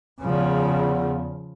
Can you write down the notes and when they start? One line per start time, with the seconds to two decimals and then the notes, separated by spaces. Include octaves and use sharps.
0.20 E2 C#3 F3